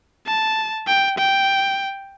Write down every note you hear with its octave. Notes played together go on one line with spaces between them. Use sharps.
A5
G5
G5